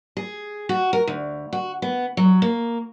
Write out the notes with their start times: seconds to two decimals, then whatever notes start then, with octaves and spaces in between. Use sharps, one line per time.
0.17 G#4
0.69 F#4
0.93 A#4
1.07 D2
1.53 F#4
1.82 B3
2.17 F#3
2.42 A#3